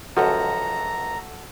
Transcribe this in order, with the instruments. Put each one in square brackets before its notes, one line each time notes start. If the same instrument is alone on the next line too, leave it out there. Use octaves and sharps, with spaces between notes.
[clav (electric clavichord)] C#2 F#2 F3 [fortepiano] F#4 A4 [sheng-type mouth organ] A#5